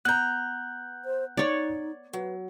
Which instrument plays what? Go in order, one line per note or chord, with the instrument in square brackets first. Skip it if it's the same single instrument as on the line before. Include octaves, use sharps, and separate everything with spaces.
[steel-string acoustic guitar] B3 A#5 [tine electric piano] F#6 G6
[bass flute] C5
[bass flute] D#4 [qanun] C#5 D5
[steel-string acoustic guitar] F#3 [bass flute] B4